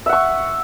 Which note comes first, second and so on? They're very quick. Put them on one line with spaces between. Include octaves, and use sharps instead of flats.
E5 F#5 C#6